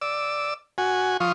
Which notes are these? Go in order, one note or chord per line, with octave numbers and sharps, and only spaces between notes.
D5 E6
F#4 G#5
F3 F4 C#6 D#6